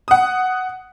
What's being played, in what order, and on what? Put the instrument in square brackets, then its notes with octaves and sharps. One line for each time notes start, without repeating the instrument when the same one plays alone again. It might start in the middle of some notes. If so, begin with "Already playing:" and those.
[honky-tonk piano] F#5 D#6